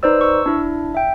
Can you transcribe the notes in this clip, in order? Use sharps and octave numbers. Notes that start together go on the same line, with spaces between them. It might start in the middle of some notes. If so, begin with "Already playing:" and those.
D#4 B4 C5 D5 E6
C#6 E6
D4 E4
E5 G5